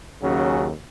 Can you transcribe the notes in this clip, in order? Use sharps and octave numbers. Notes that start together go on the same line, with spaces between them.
D#2 C#3 F#3 C#4